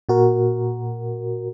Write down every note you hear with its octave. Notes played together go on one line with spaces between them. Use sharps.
A#2 F#4 A#4